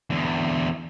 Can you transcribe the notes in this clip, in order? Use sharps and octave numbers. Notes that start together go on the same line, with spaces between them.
E2 D3